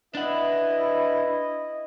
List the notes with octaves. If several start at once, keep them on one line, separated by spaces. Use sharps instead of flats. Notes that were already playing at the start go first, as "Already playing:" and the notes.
D4 E4 B4 D#5 F#5